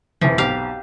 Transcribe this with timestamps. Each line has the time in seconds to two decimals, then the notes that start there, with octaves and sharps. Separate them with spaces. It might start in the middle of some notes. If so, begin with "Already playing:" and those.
0.21 F1 E3 F3
0.38 B1 G4 F5